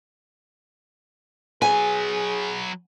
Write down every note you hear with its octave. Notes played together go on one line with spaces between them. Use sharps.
F#3 G#4 B4 G#5